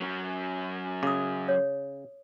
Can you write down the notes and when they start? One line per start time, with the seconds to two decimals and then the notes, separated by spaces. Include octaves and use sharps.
0.01 F#3 C#4
1.03 C#3 D6 D#6
1.48 C#5